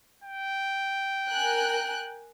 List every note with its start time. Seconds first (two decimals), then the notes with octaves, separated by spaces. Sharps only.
0.24 G5
1.29 A#4 G#5 F#6